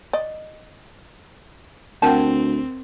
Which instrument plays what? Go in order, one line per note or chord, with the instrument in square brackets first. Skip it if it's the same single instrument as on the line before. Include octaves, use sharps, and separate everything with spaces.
[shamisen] D5 D#5
[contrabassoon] D2 [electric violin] C4 [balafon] A#4 F#5 G5 [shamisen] A5